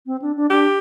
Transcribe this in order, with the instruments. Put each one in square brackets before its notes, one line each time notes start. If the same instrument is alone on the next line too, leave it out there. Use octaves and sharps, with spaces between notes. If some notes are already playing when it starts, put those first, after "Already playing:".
[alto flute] C4
D4
D4
[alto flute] D4 [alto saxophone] G4